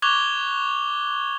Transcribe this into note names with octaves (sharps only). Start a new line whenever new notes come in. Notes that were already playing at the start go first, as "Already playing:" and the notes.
C#6 D6 F#6 G#6 F7 G7